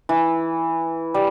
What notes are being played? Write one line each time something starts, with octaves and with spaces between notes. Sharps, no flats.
E3
G3